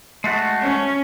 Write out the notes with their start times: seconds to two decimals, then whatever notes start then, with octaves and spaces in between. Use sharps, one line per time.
0.24 G#3 A3 F#4
0.62 C#4